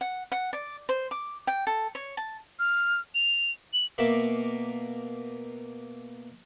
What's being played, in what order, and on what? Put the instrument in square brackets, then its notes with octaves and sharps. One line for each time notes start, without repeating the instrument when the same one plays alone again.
[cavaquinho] F#5
F#5
D5
C5
D6
G5
A4
C#5
A5
[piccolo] F6
F7
F#7
[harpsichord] B2 A#3 E5 D6